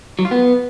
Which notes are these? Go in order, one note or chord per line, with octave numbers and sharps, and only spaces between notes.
F#3
F4
B3